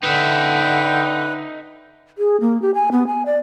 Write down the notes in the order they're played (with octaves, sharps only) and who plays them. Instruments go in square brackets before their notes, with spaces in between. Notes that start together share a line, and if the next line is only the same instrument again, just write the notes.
[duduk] D3 [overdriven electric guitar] D#4 E5 [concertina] B4 [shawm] G5
[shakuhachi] G#4
A#3
G4
G#5
B3
G#5
D5